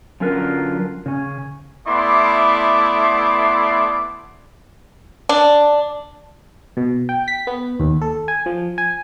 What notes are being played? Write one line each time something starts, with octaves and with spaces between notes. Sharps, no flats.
D3 F#3 C#4 F4 A#4 B4
C#3 C#4
A3 B3 E4 D5 C6 D6
D4
B2
G5
B6
B3
D#2
A4
G#5
F3
G#5